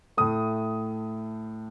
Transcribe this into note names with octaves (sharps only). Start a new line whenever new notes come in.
A2 A3 D#6